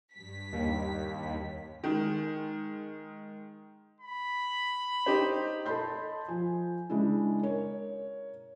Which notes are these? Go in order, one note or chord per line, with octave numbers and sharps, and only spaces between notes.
G2 B6
D#2
D#3 G#3
B5
D#4 G4 C5
A4 D#5 A5 B5 C6 G6
F3 G#5
C#3 G#3 D4 E4
A#4 C#5